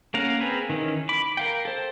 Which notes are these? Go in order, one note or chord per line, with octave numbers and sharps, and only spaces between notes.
A#3 C#4 A#4 F5 F#5
C4 G#4 A#4 B4
D#3 E3 C#4
B5 D6
A#4 F5 G5
A4 C5